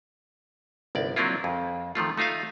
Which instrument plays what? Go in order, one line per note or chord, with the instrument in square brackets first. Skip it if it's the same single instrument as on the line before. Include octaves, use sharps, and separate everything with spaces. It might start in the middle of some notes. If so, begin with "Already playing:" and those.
[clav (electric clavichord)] G1 C2 D5
F#3 A#3 C4 D4 E4 F4
F2
D#3 F3 A3 F4
A3 D#4 F4 E5 F5